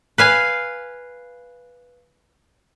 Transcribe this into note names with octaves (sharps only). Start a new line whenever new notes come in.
B4 F5 G#5